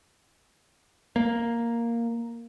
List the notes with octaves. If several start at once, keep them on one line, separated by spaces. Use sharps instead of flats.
A#3